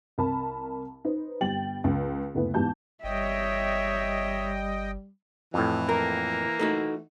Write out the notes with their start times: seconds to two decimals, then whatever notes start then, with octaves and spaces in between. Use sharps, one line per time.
0.18 C2 A#4 A5 B5
1.05 D#4 B4 C5
1.41 G1 G3 G5 A6 F#7
1.84 C#2
2.34 F#1 D2 A3 B3 E4
2.54 E2 G#2 E3 G4 A5 G6
3.04 G1 G3 C#5 D#5 E5 G5
5.54 F2 A2 E3
5.89 A#3 A#4
6.59 A3 D#4 F#4